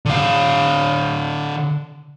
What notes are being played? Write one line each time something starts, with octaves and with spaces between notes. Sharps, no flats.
D3 F5